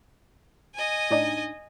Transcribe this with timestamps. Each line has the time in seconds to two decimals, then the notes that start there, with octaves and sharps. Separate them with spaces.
0.75 D#5 G#5
1.10 A2 D4 D#4